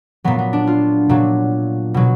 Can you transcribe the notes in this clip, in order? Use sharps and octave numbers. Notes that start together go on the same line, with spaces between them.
A#2 F#3 B3
B3
D4
F4
A#2 F#3
B2 F#3